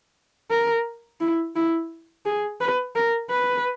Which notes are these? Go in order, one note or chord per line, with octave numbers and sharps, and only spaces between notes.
A#4
E4
E4
G#4
B4
A#4
B4